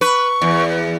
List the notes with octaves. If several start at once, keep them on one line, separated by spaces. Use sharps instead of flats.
B4 C#6
E2